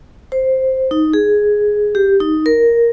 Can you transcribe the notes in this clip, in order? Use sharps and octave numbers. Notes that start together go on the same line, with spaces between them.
C5
D#4
G#4
G4
D#4
A#4